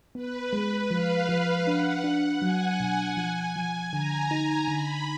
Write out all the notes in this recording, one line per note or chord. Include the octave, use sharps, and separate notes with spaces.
B3 B4
G#3
F3 F5
F3
D4 F#5
D4
F#3 G#5
B2
F3
F3
D3 A#5
D#4
D3 B5